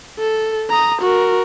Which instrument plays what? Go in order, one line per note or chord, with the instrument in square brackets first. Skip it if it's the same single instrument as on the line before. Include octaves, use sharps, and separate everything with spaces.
[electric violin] A4
A#5 D#6
F#4 A#4